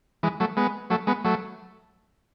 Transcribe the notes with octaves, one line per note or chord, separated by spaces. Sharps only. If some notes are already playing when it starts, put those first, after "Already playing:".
E3 G#3
F#3 A3
G#3 B3
F#3 A3
G#3 B3
F#3 A3